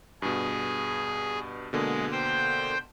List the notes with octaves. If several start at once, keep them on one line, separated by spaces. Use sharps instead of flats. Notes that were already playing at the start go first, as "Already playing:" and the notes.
G2 B2 G#4
B2 D3 G#3 A#3
C5 G5